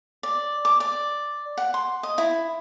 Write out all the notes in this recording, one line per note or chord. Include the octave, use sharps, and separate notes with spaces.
D5
D6
D5
F#5
C6
D#5
E4